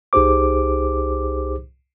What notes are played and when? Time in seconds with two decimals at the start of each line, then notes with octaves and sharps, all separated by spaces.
0.13 C2 D#4 G4 G#4 C5 D6